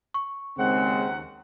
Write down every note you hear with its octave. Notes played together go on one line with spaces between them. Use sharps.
C#6
D#2 C#3 G#3 C4 F#5